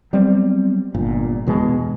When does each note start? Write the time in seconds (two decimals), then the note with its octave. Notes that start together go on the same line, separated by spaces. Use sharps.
0.13 F#3 G3 B3 C4
0.94 G1 A#2
1.47 E2 B2 G#3